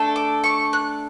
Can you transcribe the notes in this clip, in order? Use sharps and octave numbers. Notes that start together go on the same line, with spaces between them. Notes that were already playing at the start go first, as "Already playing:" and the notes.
Already playing: A3 D4 A4
D6
C#6
F#6